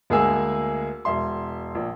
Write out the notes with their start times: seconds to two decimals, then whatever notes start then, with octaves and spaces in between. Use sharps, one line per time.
0.10 D2 G#3 A#3 G#4 G#5 E6
1.05 E1 E5 C6
1.75 A#1